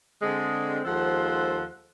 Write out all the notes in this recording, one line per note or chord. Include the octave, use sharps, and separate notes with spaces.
D3 G#3 C4
D#2 F3 G#3 A4 C5 F#5